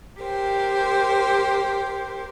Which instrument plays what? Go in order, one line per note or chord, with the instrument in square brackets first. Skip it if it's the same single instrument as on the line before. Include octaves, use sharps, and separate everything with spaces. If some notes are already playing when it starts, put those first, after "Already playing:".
[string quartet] G4 A#4 C5 G5